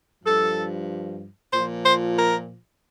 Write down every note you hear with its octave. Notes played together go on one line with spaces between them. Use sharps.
G2 F3 A4
A#2 F3 C5
C5
A#4